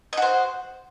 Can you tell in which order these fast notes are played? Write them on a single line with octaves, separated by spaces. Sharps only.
D#5 F#4 C5